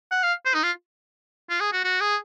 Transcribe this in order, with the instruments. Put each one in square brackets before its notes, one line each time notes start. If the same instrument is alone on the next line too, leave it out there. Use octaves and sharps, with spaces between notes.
[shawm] F#5
F5
C5
D#4
F4
F4
G#4
F#4
F#4
G#4